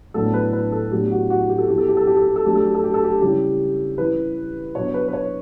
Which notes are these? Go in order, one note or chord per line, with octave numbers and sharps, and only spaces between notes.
A2 F#3 B3 D4 A4
B4
B4
A4
A2 F#3 B3 D4 G4
F#4
F#4
G4
A4
F#3 B3 E4 G4
A4
G4
A4
G4
A4
G4
A4
F#3 A3 D4 G4
A4
G4
A4
G4
A4
G4
C#3 G3 C#4 E4 G4
E3 G3 C#4 E4 B4
B2 F#3 B3 D4 C#5
B4
B4
C#5